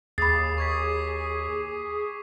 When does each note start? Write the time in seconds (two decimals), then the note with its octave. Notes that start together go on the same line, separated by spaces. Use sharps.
0.18 D#2 G#4 B5 D6 D#6 A6 C7
0.58 C#6 G#6 B6